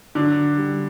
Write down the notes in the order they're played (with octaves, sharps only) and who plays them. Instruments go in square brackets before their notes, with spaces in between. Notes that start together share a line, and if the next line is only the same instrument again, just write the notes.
[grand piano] D3 F#3 [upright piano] D4
[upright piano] G3